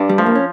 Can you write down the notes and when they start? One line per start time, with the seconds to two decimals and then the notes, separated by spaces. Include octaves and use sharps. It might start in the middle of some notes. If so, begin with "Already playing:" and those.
Already playing: G2 D4
0.09 G3
0.18 F3 A3
0.26 A#3
0.35 C#4